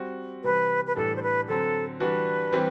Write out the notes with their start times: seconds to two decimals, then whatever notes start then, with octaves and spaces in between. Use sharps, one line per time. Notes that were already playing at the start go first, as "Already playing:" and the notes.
Already playing: G3 C4 F#4
0.44 C3 E3 G3 B4
0.87 B4
0.96 A2 E3 G3 D4 A4
1.16 C5
1.23 B4
1.48 D3 F#3 C4 A4
2.00 E3 G3 D4 F#4 B4
2.52 E3 G3 C4 G4